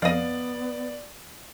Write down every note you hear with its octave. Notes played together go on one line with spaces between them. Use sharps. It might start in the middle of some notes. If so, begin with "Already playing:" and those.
F2 B3 D5 D#5 F5